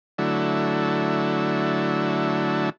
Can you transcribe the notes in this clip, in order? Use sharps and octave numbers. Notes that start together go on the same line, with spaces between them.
D3 F#3 A3 E4